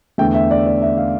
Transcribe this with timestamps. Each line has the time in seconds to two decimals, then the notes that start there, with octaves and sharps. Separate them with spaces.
0.18 E2 D3 A3 G5
0.34 E5
0.51 D5
0.66 D5
0.82 E5
0.98 F5